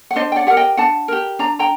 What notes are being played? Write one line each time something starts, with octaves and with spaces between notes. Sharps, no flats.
F#5
D4 C5 D#5
G5
D5 F#5
G4 A#4 F#5
D#5 G5
D4 F#5 A5
G4 A#4
D4 A#5
G5 A#5